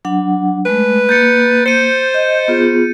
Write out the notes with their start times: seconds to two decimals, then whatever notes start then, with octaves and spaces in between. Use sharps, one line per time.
0.05 F#3 D4 F#5
0.66 G#3 A3 B4
1.09 A#3 G6 A6 C#7
1.66 C5 C#7 D#7
2.14 D#5
2.48 B3 F4 G#4